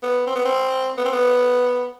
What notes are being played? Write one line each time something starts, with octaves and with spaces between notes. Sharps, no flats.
B3
C4
B3
C4
B3
C4
B3